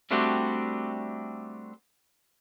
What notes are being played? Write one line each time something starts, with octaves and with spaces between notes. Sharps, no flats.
G3 A3 C4 D4 F#4 G4